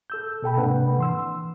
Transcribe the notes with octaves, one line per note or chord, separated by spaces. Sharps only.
A4 E6 G6
B2 A4 G5 B5
G#2 C3 A#3 D4 B4 F#5
E3 C6 E6